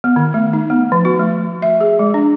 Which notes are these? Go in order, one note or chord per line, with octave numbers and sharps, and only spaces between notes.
B3
D#3
A3
D#4
B3
F3
F#4
A3
E5
G#4
G#3
D4